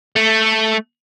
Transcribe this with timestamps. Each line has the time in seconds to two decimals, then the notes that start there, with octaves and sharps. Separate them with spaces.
0.16 A3